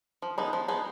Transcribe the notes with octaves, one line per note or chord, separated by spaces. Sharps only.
F3
G#3 B3 D#4 G#4
F3
G#3 B3 D#4 G#4